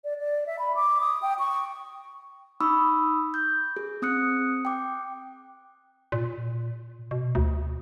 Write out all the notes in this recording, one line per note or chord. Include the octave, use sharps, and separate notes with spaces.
D5
D5
E5
B5
D6
D#6
G5
C#6
D#4 B5 C#6 D#6 E6
G6
G#4
C4 D#6 F#6 C#7
G5 D6
A#2
B2
D2